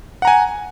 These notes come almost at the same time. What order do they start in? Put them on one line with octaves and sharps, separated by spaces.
F#5 A#5 G#5